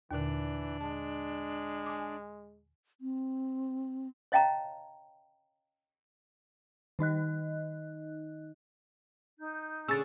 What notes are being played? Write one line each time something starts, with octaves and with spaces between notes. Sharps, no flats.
D#2 A#2 D3 E3 D4
G#3 A5
G#5 D6
C4
C#5 D#5 F5 G5 A5 A#5
D#3 D#4 D#5 F#6
D#4 G6
D3 C#4 G#4 E6 A6